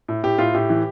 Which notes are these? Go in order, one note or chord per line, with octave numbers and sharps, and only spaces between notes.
A2
A2 G4
A2 F4
A2 G4
E3